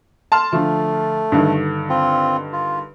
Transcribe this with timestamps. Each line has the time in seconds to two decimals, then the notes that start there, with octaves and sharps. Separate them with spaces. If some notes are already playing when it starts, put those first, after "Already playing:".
0.32 A5 C6 F6
0.53 D3 F3 A3
1.32 G2 D3 D#3
1.90 C4 F4
2.53 F4